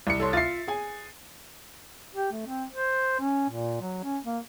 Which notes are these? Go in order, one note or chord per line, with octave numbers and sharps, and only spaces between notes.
C2 C#7
A4 C#5 C6
F4 E5 A6 C7
G#4 G#5
G4
A3
C4
C5
C#4
A#2
F#3
C#4
A#3